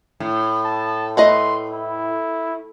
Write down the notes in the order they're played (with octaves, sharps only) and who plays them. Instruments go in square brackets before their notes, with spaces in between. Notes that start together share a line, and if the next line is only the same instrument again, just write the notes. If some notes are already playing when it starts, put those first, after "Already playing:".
[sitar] A2
[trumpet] A5
[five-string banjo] A3 B4 D#5 [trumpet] C6
[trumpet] E4